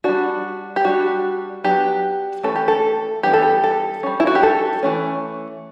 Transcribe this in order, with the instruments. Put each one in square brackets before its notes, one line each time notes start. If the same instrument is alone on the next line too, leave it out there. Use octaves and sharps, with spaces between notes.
[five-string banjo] G3 D4 F#4
G4
G3 D4 F#4
F#3 B3 D4 G4
E3 A3 C#4 A4
G4
A4
E3 G3 B3 D4 G4
A4
G4
A4
G3 C#4
E4
F#4
G4
A4
E3 A3 C#4